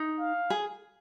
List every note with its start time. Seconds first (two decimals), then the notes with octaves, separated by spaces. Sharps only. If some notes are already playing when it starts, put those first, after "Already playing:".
Already playing: D#4
0.20 F5
0.50 G#4